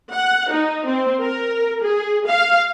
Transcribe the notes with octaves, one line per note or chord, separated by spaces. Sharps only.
F#5
D#4
C4
A#4
G#4
F5